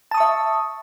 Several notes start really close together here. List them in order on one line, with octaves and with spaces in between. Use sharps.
A5 D#6 C#6 E5